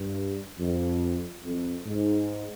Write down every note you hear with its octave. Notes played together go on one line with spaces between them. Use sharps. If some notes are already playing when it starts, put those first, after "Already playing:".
Already playing: G2
F2
F2
G#2